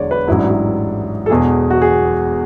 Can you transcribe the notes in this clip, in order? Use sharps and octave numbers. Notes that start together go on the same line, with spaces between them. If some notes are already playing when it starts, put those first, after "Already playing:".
Already playing: E1 E2 D3 C#5 D5
B4
A1 G#2 F#3 E4
D4
E4
A4
E1 E2 B2 G#4
F#4
G#4